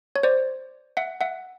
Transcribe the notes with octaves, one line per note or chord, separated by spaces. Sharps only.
C#5
C5 D5
E5 F#5
E5 F#5